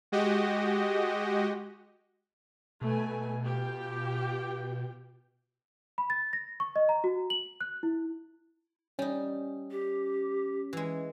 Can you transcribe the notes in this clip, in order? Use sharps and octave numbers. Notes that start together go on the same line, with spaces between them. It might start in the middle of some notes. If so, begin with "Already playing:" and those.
G#3 F#4 G4 D#5
B2 A3 B4 G#5
F4 G4 G5
B5
A6
A#6
C#6
D#5
A#5
F#4
F#7
F#6
E4
G3 C#4 D#4
G4
E3 G#3